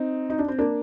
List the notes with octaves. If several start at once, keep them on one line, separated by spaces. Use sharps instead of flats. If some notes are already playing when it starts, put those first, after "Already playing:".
Already playing: C4 D#4
D#4
D4
C4
A#3 D4